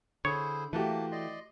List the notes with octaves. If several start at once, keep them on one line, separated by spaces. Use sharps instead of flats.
D3 E4 G#4 C5 C#5
E3 A3 A#3 F#4 G4 A5
D5 D#5 C6